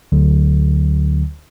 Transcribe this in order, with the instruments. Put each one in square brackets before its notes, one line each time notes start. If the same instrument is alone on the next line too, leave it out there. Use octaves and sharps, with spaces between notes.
[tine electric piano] D2 D3 F#3